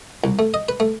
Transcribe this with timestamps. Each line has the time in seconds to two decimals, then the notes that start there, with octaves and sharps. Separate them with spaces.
0.24 C2
0.39 A3
0.54 D#5
0.69 B4
0.80 A3